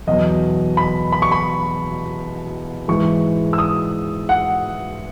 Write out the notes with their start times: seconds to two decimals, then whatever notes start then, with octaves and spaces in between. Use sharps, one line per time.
0.07 E2 B2 F#3 D#5
0.77 B5
1.12 B5
1.22 C#6
1.32 B5
2.88 G#2 E3 G#3 C#6
3.53 E6
3.58 D#6
4.29 F#5